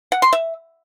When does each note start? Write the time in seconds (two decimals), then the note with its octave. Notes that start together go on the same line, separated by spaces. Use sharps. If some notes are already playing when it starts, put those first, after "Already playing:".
0.12 F#5
0.22 C6
0.33 E5